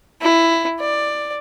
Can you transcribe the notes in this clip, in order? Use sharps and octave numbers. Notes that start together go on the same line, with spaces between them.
E4
D5